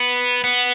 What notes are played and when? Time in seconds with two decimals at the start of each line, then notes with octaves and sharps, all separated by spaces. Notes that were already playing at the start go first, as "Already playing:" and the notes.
Already playing: B3
0.44 B3